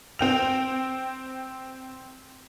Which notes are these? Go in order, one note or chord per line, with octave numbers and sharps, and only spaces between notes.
C4 G5 F7